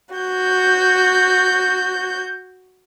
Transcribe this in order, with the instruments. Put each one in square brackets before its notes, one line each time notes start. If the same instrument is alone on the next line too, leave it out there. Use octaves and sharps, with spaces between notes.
[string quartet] F#4 G6